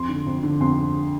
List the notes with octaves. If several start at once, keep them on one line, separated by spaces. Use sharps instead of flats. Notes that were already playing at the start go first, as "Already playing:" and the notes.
Already playing: F2 C6
D3
F2
D3
F2 C6